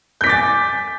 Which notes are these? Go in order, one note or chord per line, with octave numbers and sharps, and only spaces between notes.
G#5 D6 G6 A6 B6